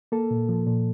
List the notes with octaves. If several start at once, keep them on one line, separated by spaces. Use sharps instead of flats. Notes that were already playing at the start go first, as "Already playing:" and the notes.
A#3 A4
A#2
F3
A#2